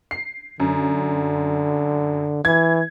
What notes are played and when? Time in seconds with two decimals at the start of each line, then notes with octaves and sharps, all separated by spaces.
0.11 C7
0.60 F#2 D3
2.45 E3 G#6